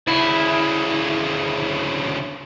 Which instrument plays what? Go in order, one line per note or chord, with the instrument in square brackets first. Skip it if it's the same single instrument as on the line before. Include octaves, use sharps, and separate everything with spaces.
[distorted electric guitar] D2 C#3 [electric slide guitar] E4